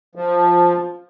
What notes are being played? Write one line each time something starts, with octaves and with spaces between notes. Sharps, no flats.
F3